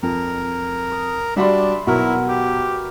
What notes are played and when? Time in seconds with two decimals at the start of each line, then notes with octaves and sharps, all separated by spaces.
0.03 F2 A#4
0.92 D#6
1.36 G3 D4 F#4 D5 E5 B5 C6
1.87 B1 E4 F#4 A#4 B4
2.28 G4